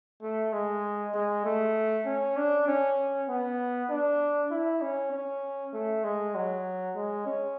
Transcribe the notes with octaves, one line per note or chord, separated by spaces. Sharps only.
A3
G#3
G#3
A3
C#4
D4
C#4
B3
D4
E4
C#4
C#4
A3
G#3
F#3
G#3
C#4